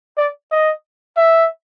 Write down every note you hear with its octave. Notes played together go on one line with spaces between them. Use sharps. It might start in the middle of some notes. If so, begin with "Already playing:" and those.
D5
D#5
E5